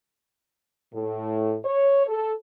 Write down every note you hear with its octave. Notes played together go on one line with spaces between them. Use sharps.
A2
C#5
A4